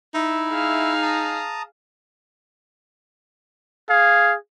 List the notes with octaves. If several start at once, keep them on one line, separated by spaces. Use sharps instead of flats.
D#4 E4 E5
G#4 F5
A5 A#5 D#6
G#4 F5